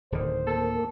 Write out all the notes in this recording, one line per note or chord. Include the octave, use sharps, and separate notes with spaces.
D1 D3 D#3 C5
A#3 A4